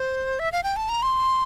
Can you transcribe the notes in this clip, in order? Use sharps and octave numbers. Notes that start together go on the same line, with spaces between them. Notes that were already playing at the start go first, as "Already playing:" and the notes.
Already playing: C5
E5
F5
G5
A5
A#5
C6